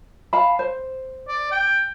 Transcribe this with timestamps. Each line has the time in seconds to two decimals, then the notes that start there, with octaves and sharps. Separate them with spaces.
0.33 F5 A5 B5
0.59 C5
1.28 D5
1.52 G5